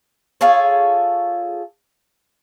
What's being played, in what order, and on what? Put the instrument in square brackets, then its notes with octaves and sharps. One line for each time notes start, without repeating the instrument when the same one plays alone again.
[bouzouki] F4 G#4 A4 C#5